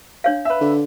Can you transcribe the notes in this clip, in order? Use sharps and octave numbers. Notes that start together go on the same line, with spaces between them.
D4 C#5 F5
B4 E5
D3